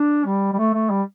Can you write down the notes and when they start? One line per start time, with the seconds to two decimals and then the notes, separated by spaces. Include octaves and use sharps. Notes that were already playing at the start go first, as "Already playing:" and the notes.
Already playing: D4
0.26 G3
0.53 G3
0.58 A3
0.74 A3
0.90 G3